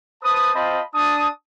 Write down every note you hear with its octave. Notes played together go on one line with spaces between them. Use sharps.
B4 C5 A5 D#6
C4 F4 C5 D#5 A5 B5
D4 A5 D#6